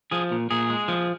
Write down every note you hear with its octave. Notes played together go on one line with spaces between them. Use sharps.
F3 G#4
A#2
A#2 G#4
G#3
F3